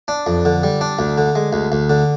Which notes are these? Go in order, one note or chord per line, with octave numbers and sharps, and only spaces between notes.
D4
F2
D3
G3
D4
D2
D3
G#3
D2
D2
D3